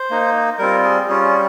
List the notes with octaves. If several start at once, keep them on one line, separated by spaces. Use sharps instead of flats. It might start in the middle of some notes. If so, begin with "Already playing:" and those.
Already playing: C5
A#3 D#4
G3 C4 F4 A#4
G#4
G3 C#4 F4 G#4
G#4